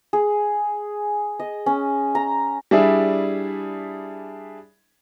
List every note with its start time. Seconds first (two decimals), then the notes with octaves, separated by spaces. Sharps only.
0.13 G#4
1.40 D#5
1.66 C#4
2.15 A#5
2.71 G3 D4 E4 G#4 E5